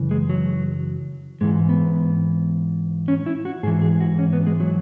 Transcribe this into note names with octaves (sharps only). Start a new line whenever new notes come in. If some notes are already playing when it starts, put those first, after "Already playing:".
Already playing: F#2 C#3 E3
G#3
F#3
G#2 E3 G#3
B3
C#4
E4
F#4
G#2 E3 G#4
G#4
F#4
C#4
B3
G#3
F#3